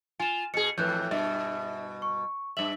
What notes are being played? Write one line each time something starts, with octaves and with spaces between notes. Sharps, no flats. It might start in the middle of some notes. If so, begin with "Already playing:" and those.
F4 G#5 E7
B2 G#4 C#7
F2 A2 E3 B4 F#6 G6
G2 B2 E5
C#6
G2 E5 F#7